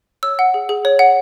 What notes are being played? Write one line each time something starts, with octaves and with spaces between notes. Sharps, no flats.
C#5 E6
F#5
G#4
G#4
C#5
F#5